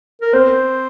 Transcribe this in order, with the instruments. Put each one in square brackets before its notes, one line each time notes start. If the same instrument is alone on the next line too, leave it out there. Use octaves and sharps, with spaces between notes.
[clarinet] A#4
[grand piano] C4 [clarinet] C5